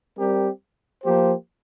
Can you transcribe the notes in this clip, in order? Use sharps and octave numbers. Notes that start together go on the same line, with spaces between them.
G3 C4 G4 A#4
F3 A#3 G4 C5